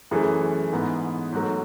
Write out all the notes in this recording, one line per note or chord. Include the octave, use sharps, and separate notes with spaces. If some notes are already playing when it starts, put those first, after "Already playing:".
F#2 E3 A3 G#4
G#2 E3 B3
G#2 F#3 A3